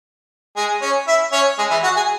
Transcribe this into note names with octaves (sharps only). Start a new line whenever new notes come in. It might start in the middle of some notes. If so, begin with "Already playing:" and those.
G#3 G#4
C#4 C#5
E4 E5
C#4 C#5
G#3 G#4
E3 E4
F#4 F#5
G#4 G#5